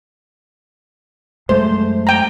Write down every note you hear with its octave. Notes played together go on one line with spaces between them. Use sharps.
F#2 G#3 A3 C5
G5 A#5